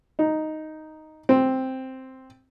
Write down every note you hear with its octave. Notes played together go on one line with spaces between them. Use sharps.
D#4
C4